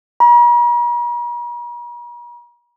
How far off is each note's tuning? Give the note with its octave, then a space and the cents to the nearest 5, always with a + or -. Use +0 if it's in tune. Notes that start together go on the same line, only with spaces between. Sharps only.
A#5 +45